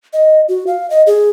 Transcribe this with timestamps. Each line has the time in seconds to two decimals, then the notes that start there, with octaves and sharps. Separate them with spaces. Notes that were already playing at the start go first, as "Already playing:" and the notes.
0.13 D#5
0.48 F#4
0.67 F5
0.90 D#5
1.07 G#4